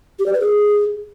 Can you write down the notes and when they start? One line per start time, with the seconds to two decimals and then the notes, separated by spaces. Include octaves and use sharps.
0.19 G4
0.26 D5
0.33 B4
0.40 G#4